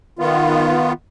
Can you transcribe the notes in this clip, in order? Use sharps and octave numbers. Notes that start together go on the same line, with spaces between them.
D#3 B3 F4